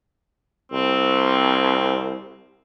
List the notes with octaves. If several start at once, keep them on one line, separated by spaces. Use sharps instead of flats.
C2 C4